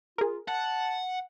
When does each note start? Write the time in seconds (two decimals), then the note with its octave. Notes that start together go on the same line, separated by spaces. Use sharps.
0.18 F4 G#4 A#4
0.48 F#5 A5